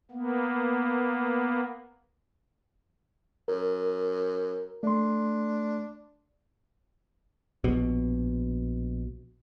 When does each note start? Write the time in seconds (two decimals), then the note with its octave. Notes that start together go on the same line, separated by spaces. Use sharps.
0.11 A#3 B3
3.48 F#2 A#4
4.83 A3 D4 C6
7.64 A#1 B2